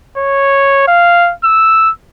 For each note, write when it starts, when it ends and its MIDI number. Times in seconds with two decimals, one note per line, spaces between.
0.17 0.87 73
0.87 1.32 77
1.44 1.91 88